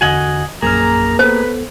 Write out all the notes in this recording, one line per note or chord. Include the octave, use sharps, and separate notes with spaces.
E2 D3 F#4 D#5 F#5 G#5
A#1 F#2 A#3 G#4 A#5 F6
B3 A4 B4 C5